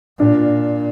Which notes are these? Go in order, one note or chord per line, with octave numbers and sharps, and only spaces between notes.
A#2 D4